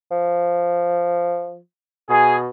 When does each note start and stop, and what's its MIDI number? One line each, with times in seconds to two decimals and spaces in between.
0.11 1.60 53
2.09 2.49 47
2.09 2.34 68